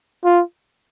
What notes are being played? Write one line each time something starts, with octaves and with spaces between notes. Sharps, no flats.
F4